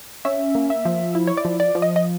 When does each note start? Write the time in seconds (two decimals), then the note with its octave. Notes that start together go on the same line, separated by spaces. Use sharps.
0.25 C#4 E5
0.55 A#3
0.70 E5
0.85 F3
1.15 E4
1.27 C#5
1.37 D5
1.45 F3
1.60 D5
1.75 F3
1.82 D#5
1.96 D#5